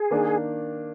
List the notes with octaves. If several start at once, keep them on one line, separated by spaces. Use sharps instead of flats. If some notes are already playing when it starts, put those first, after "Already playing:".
Already playing: G#4
D#3 A#3 D4